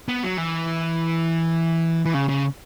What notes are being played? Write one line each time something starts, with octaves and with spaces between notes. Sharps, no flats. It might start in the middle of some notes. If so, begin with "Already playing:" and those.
B3
F#3
E3
E3
C#3
C#3